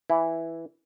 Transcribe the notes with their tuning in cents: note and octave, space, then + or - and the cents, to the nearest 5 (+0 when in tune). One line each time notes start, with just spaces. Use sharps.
E3 +0 E4 +0